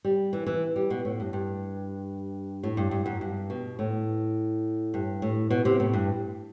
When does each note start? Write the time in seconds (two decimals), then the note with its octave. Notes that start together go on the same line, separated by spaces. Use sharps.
0.05 G3
0.33 E3
0.46 E3
0.76 G3
0.90 B2
1.05 A2
1.20 G2
1.33 G2
2.63 A2
2.77 G2
2.91 G2
3.06 F#2
3.21 G2
3.50 B2
3.79 A2
4.94 G2
5.22 A2
5.50 B2
5.65 C3
5.80 A2
5.93 G2